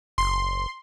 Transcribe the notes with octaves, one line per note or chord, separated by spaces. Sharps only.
F#1 C6